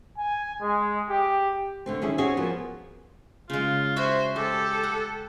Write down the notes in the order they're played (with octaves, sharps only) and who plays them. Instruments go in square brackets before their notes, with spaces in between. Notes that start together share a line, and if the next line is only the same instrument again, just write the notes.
[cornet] G#5
G#3
G4
[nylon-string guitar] D3 A3 C4
D#3 C#4 E4 G#4
C4 C#4 F#4 G#4
F3 A#3 B3
[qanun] C#3 G#3 [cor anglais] F4
[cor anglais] F#4 [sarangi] C5 [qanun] C#5 E5 B5
[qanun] G#3 [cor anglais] G4 [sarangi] A4
[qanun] F#5